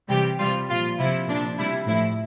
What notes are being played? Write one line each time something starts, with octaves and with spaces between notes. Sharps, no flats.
C3 E3 G3 G4
C3 G3 F4
A#2 F3 F4
C3 F3 E4
A#2 F3 D4
C3 G3 E4
A2 F3 E4